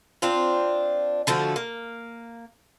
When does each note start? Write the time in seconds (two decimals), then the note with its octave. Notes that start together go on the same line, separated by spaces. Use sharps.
0.22 C4 D4 F4
1.27 D3 F3 A3 F#4
1.56 A#3